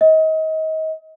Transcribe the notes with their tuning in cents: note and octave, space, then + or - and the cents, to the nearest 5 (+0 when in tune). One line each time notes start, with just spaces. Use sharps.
D#5 +30